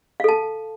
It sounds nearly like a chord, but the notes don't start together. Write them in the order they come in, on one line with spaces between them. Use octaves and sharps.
F5 A4 A5